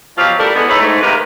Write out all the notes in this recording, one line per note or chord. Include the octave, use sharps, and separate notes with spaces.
B2 F3 F#3 G4 F5
G3 A3 D4 E4 A4 A#4
D3 E3 G#3 B3
G#3 D#4 E4 A4 B4 C#5
G#2 A3
C3 D#3 A#3 G4 B4